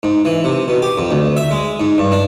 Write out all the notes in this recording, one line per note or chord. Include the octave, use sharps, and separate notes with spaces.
G#2
E3
C3
B2
G4
F2
D2
E5
G#3
G#2
G2
D4